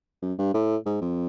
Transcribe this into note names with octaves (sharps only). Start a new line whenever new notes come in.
F#2
G2
A2
G#2
F2